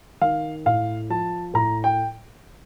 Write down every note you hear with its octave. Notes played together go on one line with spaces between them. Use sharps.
D#3 F5
A2 F5
F3 A5
A2 A#5
G5